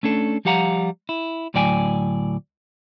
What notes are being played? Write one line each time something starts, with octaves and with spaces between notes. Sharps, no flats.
A3 C#4 D4 A4
F3 G3 G4 F5 F#5 A#5
E4
D2 A2 F#3 D5 G5 G#5